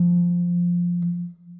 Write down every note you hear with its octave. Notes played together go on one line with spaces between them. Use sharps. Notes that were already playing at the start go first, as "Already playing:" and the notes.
Already playing: F3